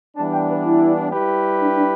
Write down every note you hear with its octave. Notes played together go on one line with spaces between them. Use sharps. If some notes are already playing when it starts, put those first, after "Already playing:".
E3 G3 B3 D4 A5
G5
B4
E4
G3 E4 G4 B4
D4
D4